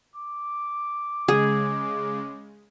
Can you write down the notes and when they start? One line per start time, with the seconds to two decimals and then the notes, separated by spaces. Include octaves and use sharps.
0.16 D6
1.28 C#3 G#3 G#4